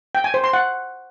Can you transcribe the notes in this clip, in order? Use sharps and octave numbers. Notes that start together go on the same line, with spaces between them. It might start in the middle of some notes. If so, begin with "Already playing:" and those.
G5
G#5
C5
C6
F#5